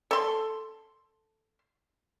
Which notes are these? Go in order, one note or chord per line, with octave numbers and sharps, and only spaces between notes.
A4 C6